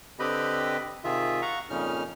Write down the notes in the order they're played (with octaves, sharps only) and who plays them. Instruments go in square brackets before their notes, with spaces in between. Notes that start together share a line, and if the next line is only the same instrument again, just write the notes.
[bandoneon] D3 C4 G4 B4 D#5 B5
C3 D#3 F4 G#4 E5
F5 F#5 A#5 C#6
F2 A#2 C#3 C#4 D#4 F6